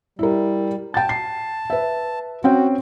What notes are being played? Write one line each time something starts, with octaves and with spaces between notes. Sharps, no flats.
G3 E4 A#4
G5 A5 A6
C7
B4 E5
C4 C#4 F#4 G5